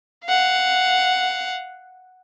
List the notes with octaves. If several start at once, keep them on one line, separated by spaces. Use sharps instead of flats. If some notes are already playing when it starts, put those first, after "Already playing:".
F5 F#5